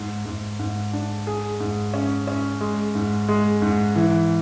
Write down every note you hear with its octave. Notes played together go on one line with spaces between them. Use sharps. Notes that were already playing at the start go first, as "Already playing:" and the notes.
Already playing: G#2
G#2
G#2
D4
G#4
G#2
C#4
C#4
G#3
G#2
G#3
G#2
E3